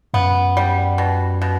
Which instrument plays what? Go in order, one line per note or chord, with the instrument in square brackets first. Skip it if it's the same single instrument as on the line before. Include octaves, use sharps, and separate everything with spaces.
[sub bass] F#2 [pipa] B3
[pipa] G3
B2
B2